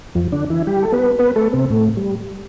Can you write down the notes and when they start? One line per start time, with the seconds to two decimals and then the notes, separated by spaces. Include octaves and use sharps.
0.15 F2 F3
0.32 D3 D4
0.50 E3 E4
0.67 G3 G4
0.82 A4
0.92 B3 B4
1.19 B3 B4
1.36 A3 A4
1.53 C3 C4
1.70 A2 A3
1.97 G3